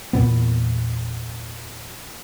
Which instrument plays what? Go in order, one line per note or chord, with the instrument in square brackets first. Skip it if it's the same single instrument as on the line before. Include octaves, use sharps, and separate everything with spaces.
[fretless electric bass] E2 A#2 B3